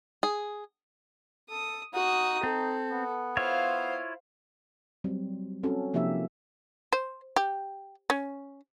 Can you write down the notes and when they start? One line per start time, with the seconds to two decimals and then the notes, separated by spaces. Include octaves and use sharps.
0.23 G#4
1.50 A4 D#6
1.94 D#4 F#4 D#6
2.43 C4 A4
2.91 B3
3.37 E4 F4 C5 C#5 F5
5.04 F#3 G3 C4
5.63 C4 C#4 F#4 A4
5.93 C3 F3 A#3 D#4 G4 E5
6.93 C5
7.36 G4
8.10 C#4